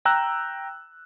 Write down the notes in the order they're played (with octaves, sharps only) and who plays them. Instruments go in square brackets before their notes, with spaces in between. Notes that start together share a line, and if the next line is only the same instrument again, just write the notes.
[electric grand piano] G5 A#5 E6 F#6